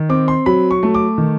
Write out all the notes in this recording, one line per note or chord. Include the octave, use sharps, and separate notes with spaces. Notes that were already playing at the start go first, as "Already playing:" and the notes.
Already playing: D#3
C4 D6
C6
F#3 B5
C#6
A3
D6
D#3